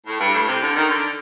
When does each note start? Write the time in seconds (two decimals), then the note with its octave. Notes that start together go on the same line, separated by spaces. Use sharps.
0.06 A2
0.20 G2
0.34 A2
0.48 C3
0.62 D3
0.76 D#3
0.89 D3